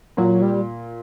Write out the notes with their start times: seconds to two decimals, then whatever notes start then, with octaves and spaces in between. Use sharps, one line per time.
0.17 A#2 F#3
0.42 G3